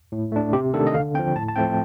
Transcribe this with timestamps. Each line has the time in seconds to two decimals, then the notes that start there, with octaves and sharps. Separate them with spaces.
0.12 A2
0.32 A3 D4
0.53 C3 G4
0.74 D#3 A3 D4 A4
0.87 D#5
0.94 D3 F5
1.14 C4 G5
1.19 F3
1.36 A2 A5
1.48 A5
1.56 F3 A3 C4 G5